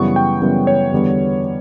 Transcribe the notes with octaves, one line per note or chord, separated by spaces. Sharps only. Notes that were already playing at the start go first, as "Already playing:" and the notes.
Already playing: F#2 C#3 E3 G3 B3 C#6
G5
F#2 C#3 E3 G3 B3
C#5
E2 D3 G3 B3